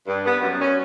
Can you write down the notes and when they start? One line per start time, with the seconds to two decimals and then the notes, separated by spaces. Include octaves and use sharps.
0.07 G2
0.25 B3
0.42 F#2
0.61 C#4